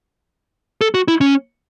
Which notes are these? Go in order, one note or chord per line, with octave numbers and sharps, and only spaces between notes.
A4
F#4
E4
C#4